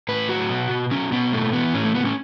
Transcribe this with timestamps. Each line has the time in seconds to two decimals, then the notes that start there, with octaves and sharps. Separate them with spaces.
0.09 A2 B4
0.29 F#3 F#4
0.50 B2
0.71 B2
0.91 F#3 C#4
1.12 B2 B3
1.32 A2 A3
1.53 E3 B3
1.74 A2 C#4
1.84 A3
1.95 A2 B3
2.05 C#4